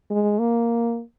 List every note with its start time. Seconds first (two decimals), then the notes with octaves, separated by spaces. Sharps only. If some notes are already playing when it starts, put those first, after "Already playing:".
0.10 G#3
0.39 A#3